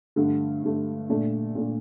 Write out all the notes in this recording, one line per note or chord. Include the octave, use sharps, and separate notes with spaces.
G2 D3 A3
G2 D3 A3
A#2 A3 D4
A#2 A3 D4